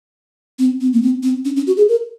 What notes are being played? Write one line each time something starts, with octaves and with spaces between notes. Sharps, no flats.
C4
C4
A#3
C4
C4
C#4
C#4
F#4
G#4
A#4